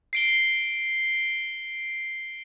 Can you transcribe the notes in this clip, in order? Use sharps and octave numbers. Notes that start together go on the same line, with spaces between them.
C7 D7 G7